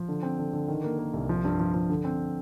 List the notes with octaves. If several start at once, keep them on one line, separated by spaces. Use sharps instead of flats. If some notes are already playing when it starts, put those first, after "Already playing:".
Already playing: F3
D3
C4
D3
D3
D#3
A#3
A#3
C2
F3
G2
F3
F3
D3
C4